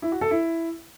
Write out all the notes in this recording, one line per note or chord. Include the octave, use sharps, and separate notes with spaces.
E4
F#4
A4
E4